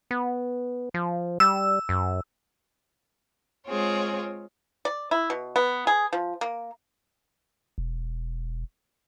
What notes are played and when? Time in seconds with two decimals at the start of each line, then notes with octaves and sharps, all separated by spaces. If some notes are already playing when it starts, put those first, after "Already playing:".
0.11 B3
0.94 F3
1.40 G3 E6
1.89 F#2
3.67 G#3 C4 F4 G#4 C#5
4.85 D5
5.11 E4
5.30 B2
5.56 B3
5.87 G#4
6.13 F3
6.41 A#3
7.78 E1